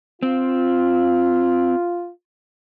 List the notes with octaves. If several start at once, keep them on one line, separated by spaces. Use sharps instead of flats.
C4 F4